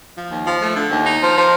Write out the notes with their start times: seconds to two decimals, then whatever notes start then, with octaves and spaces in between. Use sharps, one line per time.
0.15 F3
0.29 D#2
0.45 F3
0.60 A3
0.75 D3
0.90 D#2
1.06 D#4
1.21 F3
1.36 F3